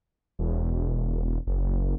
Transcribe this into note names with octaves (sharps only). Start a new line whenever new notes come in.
E1
F#1